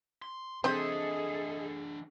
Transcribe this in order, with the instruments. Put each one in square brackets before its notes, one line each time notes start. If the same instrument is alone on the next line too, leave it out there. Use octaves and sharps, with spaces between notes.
[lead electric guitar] C6
[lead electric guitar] E3 D4 [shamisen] C4 C5 [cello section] G#4 A4 [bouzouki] D#5 E5